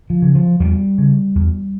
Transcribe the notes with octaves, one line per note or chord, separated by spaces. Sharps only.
F3
C#3
F3
E2 G3
C#3
E2